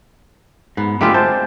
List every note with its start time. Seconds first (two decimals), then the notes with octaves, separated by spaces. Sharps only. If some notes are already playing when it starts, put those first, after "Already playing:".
0.77 G#2 B3
1.01 D3 G#3 A3 C4 F4 G4
1.14 C5 A5